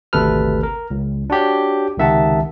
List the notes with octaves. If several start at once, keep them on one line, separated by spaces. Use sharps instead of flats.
G#1 D2 C3 A4 B4 F6
A#4
C#2
D4 F#4 G4 C#5
C#2 C3 D#3 E5 F#5 A5